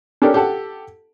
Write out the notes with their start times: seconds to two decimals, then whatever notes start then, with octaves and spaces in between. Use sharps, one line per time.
0.22 C#4 D4 G4 A4 A#4 D5
0.34 G4 A4 F#5 A5